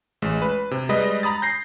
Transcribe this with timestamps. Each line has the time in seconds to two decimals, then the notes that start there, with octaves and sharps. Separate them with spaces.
0.22 A1 G#3
0.42 B4
0.71 C3
0.89 G3 G#3 B4 D#5
1.23 A#5 B5 D#6 A6
1.42 G6 A#6 C7